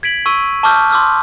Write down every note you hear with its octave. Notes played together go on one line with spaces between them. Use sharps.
G#6 B6 D7 F#7
C#6 E6 D#7
A5 C#6 D6 E6 F6 G6
C6 D6 E6 F6